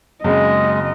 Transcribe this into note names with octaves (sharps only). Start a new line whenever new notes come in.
F#2 C#3 G#3 A#3 C4 D#5